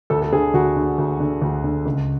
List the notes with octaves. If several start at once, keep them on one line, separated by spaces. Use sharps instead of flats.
D2 A4
A4
D3 G#4
D2 F#4
D3
D2
D3
D2
D3
C#2